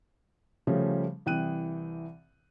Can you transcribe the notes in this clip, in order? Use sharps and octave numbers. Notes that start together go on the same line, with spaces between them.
C#3 F3 G3 A3 C#4
C2 E3 G5 F#6 D#7